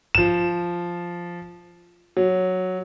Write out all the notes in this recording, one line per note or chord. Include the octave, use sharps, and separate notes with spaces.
F3 E7
F#3